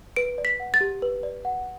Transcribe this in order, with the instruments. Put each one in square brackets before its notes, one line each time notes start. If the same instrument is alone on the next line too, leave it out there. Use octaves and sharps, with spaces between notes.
[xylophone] B4 D7
D5
B6
F#5
A6
G4
B4
D5
F#5